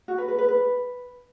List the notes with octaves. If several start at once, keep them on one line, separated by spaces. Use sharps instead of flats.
F#4
B4
B4
B4
B4